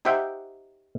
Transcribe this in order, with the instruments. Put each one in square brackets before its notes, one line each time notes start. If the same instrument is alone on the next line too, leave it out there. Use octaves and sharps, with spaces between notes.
[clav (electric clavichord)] D#4 G4 C5 E5 F#5 G5